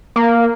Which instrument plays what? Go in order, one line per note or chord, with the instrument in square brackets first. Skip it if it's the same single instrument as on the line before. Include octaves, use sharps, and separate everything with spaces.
[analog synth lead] A#3